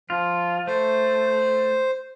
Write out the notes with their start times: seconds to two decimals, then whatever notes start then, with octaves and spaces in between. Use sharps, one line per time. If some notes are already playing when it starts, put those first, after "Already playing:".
0.10 F3 F4
0.67 A3 C5